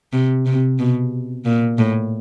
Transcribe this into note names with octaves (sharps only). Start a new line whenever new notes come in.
C3
C3
B2
A#2
A2